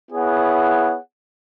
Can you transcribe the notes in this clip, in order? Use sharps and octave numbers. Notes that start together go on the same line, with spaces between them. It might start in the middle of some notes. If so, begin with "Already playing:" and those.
B3 E4 G#4 C#5 F#5